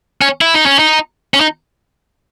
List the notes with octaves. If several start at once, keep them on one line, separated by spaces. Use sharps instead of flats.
C#4
E4
D#4
C#4
D#4
C#4
D#4